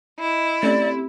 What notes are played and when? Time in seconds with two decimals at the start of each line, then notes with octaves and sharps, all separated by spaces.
0.21 E4 D#5
0.63 A3 C4 C#4 G4 D5